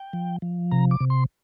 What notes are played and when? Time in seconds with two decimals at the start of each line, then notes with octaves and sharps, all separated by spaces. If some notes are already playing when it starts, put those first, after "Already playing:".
Already playing: G5
0.13 F3
0.42 F3
0.72 C3 A#5
0.91 D6
1.00 C3
1.10 C6